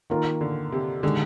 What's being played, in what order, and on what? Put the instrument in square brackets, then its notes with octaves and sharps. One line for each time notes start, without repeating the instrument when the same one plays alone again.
[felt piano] D#3 A#3 F4 A#4
[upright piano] D3
C3
[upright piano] D3 [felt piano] D#3 G#3